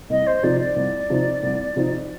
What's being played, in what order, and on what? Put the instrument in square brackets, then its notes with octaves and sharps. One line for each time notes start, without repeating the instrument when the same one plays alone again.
[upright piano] C2 [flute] D#5
[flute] C5
[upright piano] C3 F3 C4 D#4 [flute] D5
[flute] D5
[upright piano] C2
C3 F3 C4 D#4
C2
C3 F3 C4 D#4